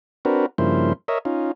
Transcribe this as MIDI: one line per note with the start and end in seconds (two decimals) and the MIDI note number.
0.25 0.46 60
0.25 0.46 62
0.25 0.46 66
0.25 0.46 70
0.25 0.46 71
0.58 0.93 43
0.58 0.93 49
0.58 0.93 53
0.58 0.93 58
0.58 0.93 64
0.58 0.93 72
1.08 1.18 70
1.08 1.18 73
1.08 1.18 75
1.08 1.18 76
1.25 1.52 61
1.25 1.52 63
1.25 1.52 65